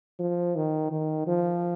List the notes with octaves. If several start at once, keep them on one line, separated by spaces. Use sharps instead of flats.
F3
D#3
D#3
F3